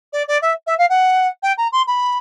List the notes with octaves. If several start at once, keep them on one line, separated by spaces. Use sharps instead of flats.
D5
D5
E5
E5
F5
F#5
G5
A#5
C6
B5